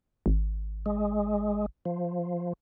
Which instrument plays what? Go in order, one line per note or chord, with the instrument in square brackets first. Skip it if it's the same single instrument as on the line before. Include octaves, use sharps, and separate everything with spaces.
[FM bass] G#1
[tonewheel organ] G#3
F3